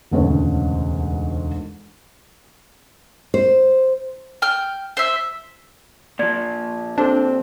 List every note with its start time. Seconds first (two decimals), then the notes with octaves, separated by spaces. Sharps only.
0.11 E1 D2 G#2 C#3 B4 C#5
3.34 C5
4.42 G5 F6
4.97 C5 E5
6.19 A#2 F3 D5 G#6
6.98 C4 D4 G4 A4